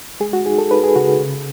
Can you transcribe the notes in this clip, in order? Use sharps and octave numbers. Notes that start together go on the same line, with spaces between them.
G#3 G#4
F#4
D#4 G#4
A4
D#4 B4
G#4
C#3 F#4
C#3